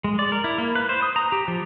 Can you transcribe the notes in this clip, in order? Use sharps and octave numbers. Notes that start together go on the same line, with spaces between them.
G#3
D5
A#4
E4
A#3
B4
C5
D#6
A#5
G4
F3